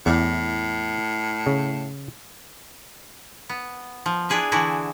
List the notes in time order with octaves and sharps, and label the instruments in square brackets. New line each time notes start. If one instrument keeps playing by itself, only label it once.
[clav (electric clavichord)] E2 [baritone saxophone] A2
[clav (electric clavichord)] C#3
[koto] B3
F3
D4 E4 G#4 B4 E5
D3 E3 D4 E4 F#4